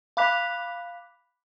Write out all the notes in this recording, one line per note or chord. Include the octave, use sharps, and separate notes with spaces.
F5 B5 D6 F#6 B6 F7